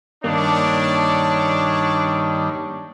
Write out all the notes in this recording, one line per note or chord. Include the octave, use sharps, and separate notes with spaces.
G2 D#3 A#3 D4 C#5